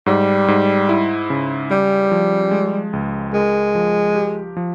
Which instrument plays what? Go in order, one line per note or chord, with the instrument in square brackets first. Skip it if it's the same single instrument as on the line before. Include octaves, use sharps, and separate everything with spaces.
[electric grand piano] G#2 [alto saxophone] G3
[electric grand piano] G#2
E4
C#3
[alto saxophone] G3 [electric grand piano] G4
[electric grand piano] F3
G#3
C#2
[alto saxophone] G#3 [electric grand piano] A#4
[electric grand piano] F3
G4
F3